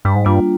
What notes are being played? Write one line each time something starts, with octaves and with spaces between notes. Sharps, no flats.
G2 G3
G#2
G2 A#3 D4 F4